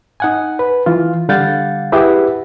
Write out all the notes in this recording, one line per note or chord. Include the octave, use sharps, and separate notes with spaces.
D#4 F#5 G#5
B4
E3 F4
D3 G3 F5 F#5 G6 A6
E4 G4 G#4 B4 E5 F#5